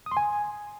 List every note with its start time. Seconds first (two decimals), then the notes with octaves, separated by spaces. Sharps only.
0.06 D#6
0.12 C6
0.17 G#5